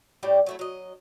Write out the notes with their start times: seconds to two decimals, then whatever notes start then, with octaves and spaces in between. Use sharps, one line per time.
0.23 A2 G3 D5 G5
0.46 F#3 A3 E4
0.59 F#3 D#5